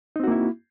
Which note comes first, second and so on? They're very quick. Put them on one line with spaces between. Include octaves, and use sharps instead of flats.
D#4 C4 F#4 A#3 E4